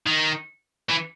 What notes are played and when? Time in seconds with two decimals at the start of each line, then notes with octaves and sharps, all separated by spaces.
0.06 D#3
0.89 E3